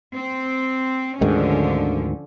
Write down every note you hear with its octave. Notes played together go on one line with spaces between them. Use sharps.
C4
D2 G#2 D3 D#3 F3 C#4